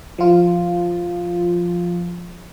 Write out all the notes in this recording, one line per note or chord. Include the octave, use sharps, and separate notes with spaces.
F3 F4